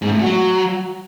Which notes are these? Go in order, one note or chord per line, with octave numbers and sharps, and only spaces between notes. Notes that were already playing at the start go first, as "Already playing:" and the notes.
G#2
A2
F#3